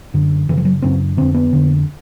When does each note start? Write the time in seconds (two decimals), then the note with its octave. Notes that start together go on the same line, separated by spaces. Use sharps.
0.14 F#2 D3
0.49 F#2 C#3 E3
0.57 F3
0.65 F#3
0.82 F#2 C#3 C4
1.17 F2 D3 C4
1.34 B3
1.53 F2 D3